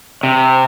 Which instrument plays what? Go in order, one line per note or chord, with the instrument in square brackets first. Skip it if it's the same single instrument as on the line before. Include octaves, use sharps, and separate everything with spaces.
[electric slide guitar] C3